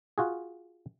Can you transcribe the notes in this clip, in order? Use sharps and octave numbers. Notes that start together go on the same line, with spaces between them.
F4 F#4 G#4